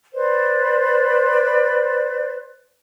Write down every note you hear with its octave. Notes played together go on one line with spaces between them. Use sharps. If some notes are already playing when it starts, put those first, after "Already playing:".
B4 C5 D5